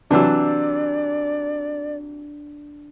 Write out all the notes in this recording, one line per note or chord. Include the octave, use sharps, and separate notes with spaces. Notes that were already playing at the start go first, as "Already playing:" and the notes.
C3 E3 F#3 D4 D5 E6